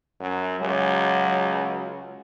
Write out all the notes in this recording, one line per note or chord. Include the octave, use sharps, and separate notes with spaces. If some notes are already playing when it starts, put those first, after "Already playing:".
F#2
C#2 F#3